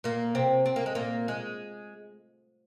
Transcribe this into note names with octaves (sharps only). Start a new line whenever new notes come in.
A#2 A#3
C3 C4
C4
A#3
G#3
A#2 A#3
G#3